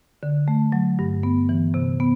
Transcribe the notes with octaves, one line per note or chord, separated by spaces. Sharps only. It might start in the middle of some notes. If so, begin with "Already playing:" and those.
D3
A3
F#3
G2
B3
E3
C3
B3